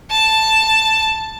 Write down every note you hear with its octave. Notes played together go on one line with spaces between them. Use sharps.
A5